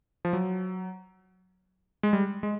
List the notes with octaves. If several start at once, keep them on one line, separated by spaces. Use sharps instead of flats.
F3
F#3
G#3
G3
G#3